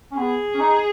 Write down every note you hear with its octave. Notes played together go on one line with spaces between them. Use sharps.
C#4
B3 G#4
C#4
D#4